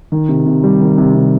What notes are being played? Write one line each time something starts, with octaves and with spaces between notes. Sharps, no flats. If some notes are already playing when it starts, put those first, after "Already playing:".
D#3
C3
C3
G3
D#3
C3
C3